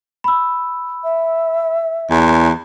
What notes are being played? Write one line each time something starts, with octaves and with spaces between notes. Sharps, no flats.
B5 E6
E5
E2